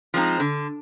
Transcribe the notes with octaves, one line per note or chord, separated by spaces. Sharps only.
F3 G#3 C4 D#4
D3